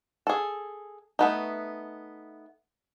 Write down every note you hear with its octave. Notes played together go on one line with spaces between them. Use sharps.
G#4 A4
A3 B3 D#4